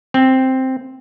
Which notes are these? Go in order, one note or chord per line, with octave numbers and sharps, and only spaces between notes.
C4